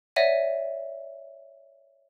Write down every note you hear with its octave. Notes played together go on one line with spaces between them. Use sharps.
C#5 D5 E5 F#5 A#6 D#7